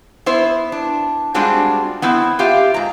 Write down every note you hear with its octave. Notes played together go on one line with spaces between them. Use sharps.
B3 E4 C5
D4
G3 G#3 C4 D4 F4 F#4
B3 C4 E4
F4 G4 E5 F5
G#2 A#5